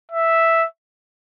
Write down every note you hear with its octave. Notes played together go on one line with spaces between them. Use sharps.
E5